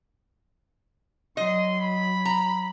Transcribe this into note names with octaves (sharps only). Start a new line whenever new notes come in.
F#3 D#5 C6
B5
A#5